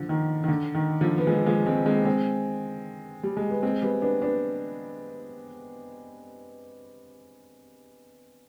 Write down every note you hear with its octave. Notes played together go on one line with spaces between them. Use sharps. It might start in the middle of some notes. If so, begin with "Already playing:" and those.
Already playing: D3 F3
D#3
D#3
D3
D#3
D3 F3
B3
F3 G#3
F3 G#3
G#3 C4
G#3 C4
G#3 C4
G3
G#3
B3
G#3 C4
G3 B3
B3 D4
B3 D4